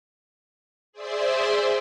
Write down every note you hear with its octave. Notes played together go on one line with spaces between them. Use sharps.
G#4 C5 D5 E5 C6